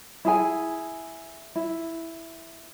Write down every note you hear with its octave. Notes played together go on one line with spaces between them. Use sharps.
E4 G#4 G#5
E4